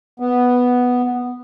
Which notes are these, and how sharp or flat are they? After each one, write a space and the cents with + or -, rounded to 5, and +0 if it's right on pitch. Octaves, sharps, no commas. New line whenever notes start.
B3 +0